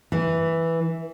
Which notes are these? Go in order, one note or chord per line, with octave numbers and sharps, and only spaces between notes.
E3